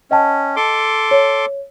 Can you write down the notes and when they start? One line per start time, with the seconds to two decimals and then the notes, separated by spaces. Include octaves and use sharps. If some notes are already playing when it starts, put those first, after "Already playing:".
0.11 C#4 D#5 G5 A5
0.56 A4 C6 D6
1.11 C#5